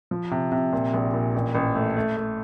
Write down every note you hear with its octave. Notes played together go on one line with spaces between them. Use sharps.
F3
C3
C3
A#2
A#1
A#2
A1
A1
A3
A3
A3